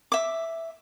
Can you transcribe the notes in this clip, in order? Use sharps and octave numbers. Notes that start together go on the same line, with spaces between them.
E5 D6